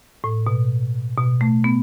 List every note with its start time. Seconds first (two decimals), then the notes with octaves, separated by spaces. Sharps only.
0.24 A2
0.47 B2
1.18 B2
1.41 A3
1.64 B3